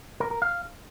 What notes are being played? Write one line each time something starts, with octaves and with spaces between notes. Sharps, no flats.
A#4
A#4
F5